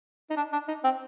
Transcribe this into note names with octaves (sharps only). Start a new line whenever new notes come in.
D#4
D4
D4
D#4
C4